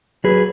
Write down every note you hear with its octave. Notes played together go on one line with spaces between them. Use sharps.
F#3 G#4 B4